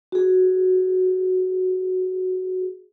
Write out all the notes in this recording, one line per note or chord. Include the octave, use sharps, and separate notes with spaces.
F#4 G#4